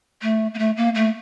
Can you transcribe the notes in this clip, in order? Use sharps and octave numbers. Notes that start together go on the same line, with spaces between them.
A3
A#3
A3
A#3
A3